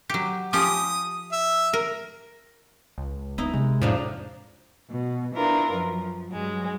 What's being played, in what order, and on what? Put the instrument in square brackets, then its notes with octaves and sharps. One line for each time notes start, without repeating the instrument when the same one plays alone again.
[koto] F#3 G4
[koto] F3 C#4 G4 [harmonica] D#6
[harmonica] E5
[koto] A#4
[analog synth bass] C#2
[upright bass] B3 [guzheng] D#4 E4
[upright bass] C3 [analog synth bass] G#3
[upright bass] F2 [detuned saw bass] A2 [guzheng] F3 D4 D#4
[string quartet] B2
D4 E4 F4 A#4 B4
F#2 F3
G2 F#3 G#3